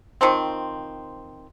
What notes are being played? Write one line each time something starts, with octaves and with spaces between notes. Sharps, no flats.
D#3 F3 C4